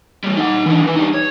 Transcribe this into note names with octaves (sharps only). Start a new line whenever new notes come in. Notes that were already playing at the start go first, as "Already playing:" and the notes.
E3 G3
D#4 F#5
E3 D4
E3 B4
G3 D#4
C#5